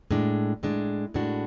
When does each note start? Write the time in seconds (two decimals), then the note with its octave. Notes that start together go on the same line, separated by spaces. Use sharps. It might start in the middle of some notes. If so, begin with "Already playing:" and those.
0.11 A2 G#3 D4
0.63 A2 G#3 D4
1.14 A2 G#3 D4 F#4